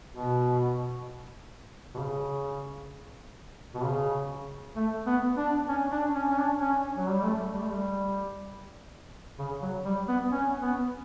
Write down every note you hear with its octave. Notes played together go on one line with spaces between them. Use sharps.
B2
B2
C#3
B2
C#3
A3
B3
D4
C#4
D4
C#4
C#4
D4
C#4
F#3
G3
A3
G3
A3
G3
C#3
F#3
G3
B3
C#4
B3